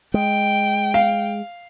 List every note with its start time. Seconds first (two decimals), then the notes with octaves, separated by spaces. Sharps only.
0.14 G#3 G5
0.94 F5